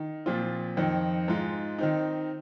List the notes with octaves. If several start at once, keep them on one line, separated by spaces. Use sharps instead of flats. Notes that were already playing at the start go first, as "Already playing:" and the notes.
Already playing: D#3
A#2 F3 C4 F4
F2 D#3 C4
G#2 G#3 F4
D#3 C4 D#4